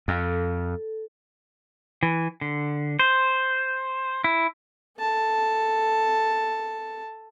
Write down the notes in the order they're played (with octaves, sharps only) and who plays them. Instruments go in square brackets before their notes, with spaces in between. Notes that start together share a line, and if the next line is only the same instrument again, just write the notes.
[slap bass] F2 [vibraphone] A4
[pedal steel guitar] E3
D3
C5
E4
[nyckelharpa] A4 A5